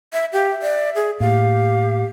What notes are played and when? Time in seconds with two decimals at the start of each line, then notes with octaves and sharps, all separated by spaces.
0.13 E5
0.33 G4 F5
0.51 E5
0.62 D5
0.95 G#4
1.20 A2 A#3 G4 F5